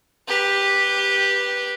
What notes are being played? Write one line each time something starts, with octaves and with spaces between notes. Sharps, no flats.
G4 B4